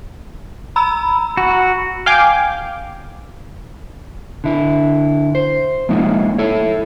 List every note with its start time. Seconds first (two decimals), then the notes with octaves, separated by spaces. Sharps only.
0.76 A#5 B5 E6
1.37 F#4
2.06 F5 G5 G#5 D6
4.44 D3 E4
5.35 C5
5.89 F3 G#3 A#3 C#4 D#4 E4
6.38 E4 A4 C#5